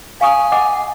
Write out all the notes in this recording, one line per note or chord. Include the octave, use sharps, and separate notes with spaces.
F5 G#5 C#6 D#6
D#5 F#5 D6